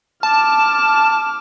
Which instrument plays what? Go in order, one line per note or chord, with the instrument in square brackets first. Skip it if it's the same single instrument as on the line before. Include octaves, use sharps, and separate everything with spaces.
[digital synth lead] A5 [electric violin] D6 F6